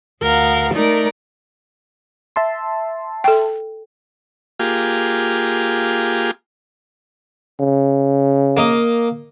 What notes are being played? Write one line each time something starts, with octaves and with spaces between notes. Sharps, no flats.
D2 A#4 F5 F#5
A3 D#4 A#4 D5
E5 A5 C6
A4 G5
A#3 F4 G4 G#4
C#3
A#3 D#5